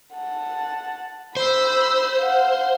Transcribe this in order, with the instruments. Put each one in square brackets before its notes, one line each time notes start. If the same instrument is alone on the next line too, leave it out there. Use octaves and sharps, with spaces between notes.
[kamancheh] F#5 A5
[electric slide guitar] C5 [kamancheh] B5 E6
[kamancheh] F5 F#5